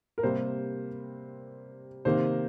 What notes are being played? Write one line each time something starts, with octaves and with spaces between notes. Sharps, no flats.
A#4
C3 G3 A#3 C5
C3 D#3 A#3 C5